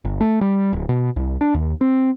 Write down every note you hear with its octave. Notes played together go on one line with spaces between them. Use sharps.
G1
A3
G3
D1
B2
C2
D4
D#2
C4